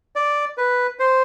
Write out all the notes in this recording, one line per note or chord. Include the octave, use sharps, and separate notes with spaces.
D5
B4
C5